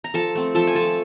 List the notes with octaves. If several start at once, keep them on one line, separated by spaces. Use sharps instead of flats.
A#5
F3 A4 A5
A3 C4
F3 A4 A5
G#5
A3 C4 A4 A5